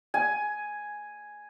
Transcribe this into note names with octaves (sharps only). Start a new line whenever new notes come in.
G#5